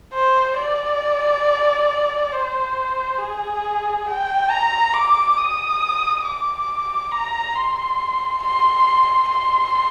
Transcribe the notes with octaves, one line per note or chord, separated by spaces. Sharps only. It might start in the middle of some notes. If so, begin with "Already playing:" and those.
C5
D5
C5
G#4
G5
A#5
D6
D#6
D6
A#5
C6
C6
C6